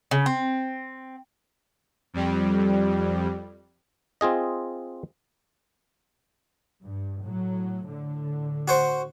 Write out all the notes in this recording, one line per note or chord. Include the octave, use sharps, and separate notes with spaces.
C#3
C4
F2 G3
C4 F4 G#4 D#5
G2
A2 F#3
A2 D3
F#4 C5 C#6